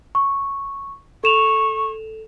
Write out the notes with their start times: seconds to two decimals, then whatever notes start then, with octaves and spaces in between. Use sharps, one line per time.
0.15 C#6
1.24 A4 C#6 E7 F7